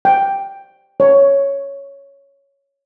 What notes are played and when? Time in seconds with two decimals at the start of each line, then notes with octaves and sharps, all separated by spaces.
0.05 G5
1.00 C#5